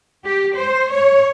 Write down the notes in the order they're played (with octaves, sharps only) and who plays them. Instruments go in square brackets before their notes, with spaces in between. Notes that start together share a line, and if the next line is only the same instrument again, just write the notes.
[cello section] G4
C5
C#5